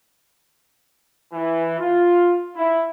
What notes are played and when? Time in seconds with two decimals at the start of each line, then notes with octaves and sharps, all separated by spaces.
1.33 E3
1.79 F4
2.56 E4